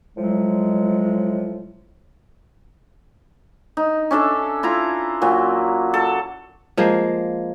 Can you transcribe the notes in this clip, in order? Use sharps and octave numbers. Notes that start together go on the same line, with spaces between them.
A2 F3 F#3 G#3
D#4
C#4 D4 A4 E5
E4 F4 A#5
A#2 F#3
A4
F3 G#3 A#3